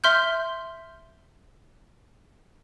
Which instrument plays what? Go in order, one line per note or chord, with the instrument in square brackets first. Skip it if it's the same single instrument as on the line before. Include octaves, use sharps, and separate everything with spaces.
[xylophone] E5 C6 F6 G6